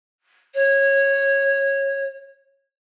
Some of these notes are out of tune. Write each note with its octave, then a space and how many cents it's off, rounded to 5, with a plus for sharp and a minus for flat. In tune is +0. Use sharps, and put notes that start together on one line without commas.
C#5 -15